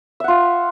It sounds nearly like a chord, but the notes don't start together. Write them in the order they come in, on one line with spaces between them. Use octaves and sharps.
E5 F#5 F4